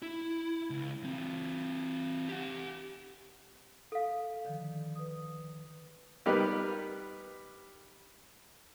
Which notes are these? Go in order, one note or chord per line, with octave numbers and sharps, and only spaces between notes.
E4
C#2
E3 C4
G4 F#5
A4 F5
D3 D#3 F3
B4 D#6
G3 B3 D#4 G4 A#4 B4